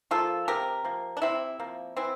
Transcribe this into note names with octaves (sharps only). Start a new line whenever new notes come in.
F3 A#3 F4 A4
C3 G4 A#4
F3 A#3
D4
C3 C4 E4
F3 A#3
E3 C4 E4